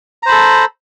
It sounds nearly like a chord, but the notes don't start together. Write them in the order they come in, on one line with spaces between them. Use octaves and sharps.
A#5 C5 B5 A4